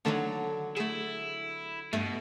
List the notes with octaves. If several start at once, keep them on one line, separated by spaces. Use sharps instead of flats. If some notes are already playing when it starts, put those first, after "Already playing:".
D3 D#3 F#3 A3 A#3
A3 E4 G#4
G2 B2 A3 E5